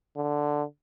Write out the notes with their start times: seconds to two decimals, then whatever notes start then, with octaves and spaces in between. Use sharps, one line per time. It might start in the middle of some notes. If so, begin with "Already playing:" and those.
0.16 D3